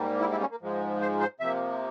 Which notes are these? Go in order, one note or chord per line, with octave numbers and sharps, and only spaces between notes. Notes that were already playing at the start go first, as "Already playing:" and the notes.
Already playing: G#2 G3 A#3
E4
E4
C#4
A#3
G#2 F3 G#3
C5
C5
C3 F3 A#3 E5